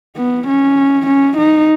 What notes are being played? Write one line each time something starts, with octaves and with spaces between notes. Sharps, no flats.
B3
C#4
C#4
D#4